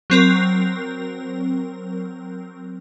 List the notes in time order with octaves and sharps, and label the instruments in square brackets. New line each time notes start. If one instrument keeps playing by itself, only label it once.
[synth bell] F#3 C4 A#4